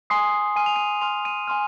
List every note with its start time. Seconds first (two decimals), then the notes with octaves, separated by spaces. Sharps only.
0.10 G#5 C6 D#6 C7
0.56 G#5 C6 F6 D#7
0.66 F7
0.76 D#7
1.01 G#5 C6 F6 F7
1.25 D#7
1.48 G#5 C6 F6